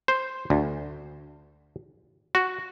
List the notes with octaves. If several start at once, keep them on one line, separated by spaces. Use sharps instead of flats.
C5
D2
F#4